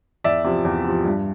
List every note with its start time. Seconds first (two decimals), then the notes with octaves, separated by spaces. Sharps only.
0.24 E2 D5 E5
0.44 C3 F3
0.65 E2
0.85 C3 F3
1.05 G2